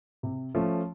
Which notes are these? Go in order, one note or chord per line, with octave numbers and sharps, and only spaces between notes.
C3
F3 A3 C#4